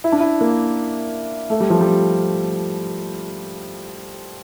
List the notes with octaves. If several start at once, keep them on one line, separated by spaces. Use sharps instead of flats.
E4
D4
E4
A#3
A3
G3
F3
G3